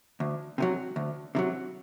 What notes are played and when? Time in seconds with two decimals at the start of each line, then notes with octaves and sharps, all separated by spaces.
0.20 D2
0.58 C3 D#3 F#3
0.96 D2
1.35 C3 D#3 F#3